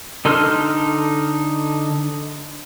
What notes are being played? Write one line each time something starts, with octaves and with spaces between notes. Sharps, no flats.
D3 D#4 A4 C6 F6